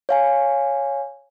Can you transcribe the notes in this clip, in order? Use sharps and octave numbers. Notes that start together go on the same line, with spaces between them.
C#5 F5 G#5